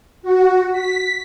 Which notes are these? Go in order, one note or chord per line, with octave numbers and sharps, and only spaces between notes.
F#4
B6